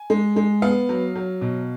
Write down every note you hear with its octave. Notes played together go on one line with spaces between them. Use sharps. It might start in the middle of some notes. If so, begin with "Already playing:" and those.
Already playing: G#5
G#3
G#3
B3 F5
F#3
F#3
B2